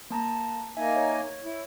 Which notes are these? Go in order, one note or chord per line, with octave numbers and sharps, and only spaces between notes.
A#3 A5 A#5
A#3 D#4 E5 G#5
C#5
E4